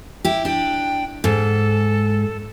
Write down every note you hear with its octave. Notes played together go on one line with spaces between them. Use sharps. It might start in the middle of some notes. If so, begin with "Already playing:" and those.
E4 G4
D4 G5
G#2 A4